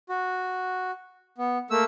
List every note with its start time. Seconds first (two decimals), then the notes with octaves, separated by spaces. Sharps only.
0.09 F#4
1.38 B3
1.71 A3 A#3 E6